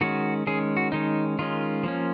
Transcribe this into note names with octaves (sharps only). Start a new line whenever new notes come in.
D#3 G#3 C#4 F#4
D#3 G#3 C#4 G#4
F#4
D#3 G#3 C#4 D#4
D#3 G#3 C#4 F4
F3 A#3 C#4